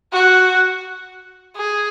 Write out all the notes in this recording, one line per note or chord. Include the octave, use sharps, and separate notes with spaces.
F#4
G#4